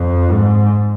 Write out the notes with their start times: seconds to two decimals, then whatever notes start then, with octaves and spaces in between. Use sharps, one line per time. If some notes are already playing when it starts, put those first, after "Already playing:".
Already playing: F2
0.30 G#2